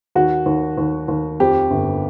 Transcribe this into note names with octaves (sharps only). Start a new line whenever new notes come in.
D#2 F#4
D#2
D#2
D#2
F2 G4
G1